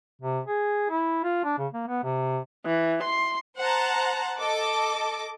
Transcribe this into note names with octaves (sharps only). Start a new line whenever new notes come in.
C3
G#4
E4
F4
D4
C#3
A#3
B3
C3
E3
C6
C5 F#5 A5 A#5
A4 D#5 D6